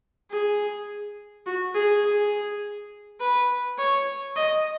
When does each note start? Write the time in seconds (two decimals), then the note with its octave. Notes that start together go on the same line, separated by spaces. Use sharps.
0.31 G#4
1.46 F#4
1.75 G#4
2.04 G#4
3.20 B4
3.78 C#5
4.36 D#5